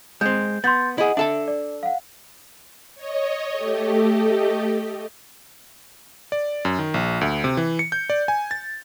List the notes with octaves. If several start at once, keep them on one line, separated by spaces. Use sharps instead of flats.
G#3 C4 G6
B3 C6 G6 A6
E4 G#4 D#5 F#5
D4 A4 E5 A5
D5
F5 F#5
C#5 D#5
A3 G4 A4 D#5
D5
F#2
D#3
A#1
D2
C3
E3
C#7
G6
D5
G#5
A6